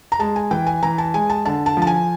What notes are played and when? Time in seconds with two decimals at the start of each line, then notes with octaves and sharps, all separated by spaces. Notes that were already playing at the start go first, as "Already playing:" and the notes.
0.12 A#5
0.19 G#3 A5
0.36 G#5
0.51 E3 G5
0.67 G#5
0.82 E3 A#5
0.98 A5
1.14 G#3 G#5
1.30 A5
1.45 D3 A5
1.66 A5
1.77 F3 A5
1.87 G#5